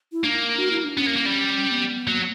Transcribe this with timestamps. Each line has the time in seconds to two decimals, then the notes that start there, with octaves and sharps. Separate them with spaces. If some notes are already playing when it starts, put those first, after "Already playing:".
0.12 E4
0.24 A#3 D4
0.58 F#4
0.72 E4
0.84 D4
0.98 B3 C#4
1.07 A#3
1.17 A#3
1.26 G3
1.71 B3
2.07 F#3 A#3